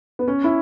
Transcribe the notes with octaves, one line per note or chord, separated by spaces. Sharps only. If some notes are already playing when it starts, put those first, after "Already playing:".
B3
C#4
E4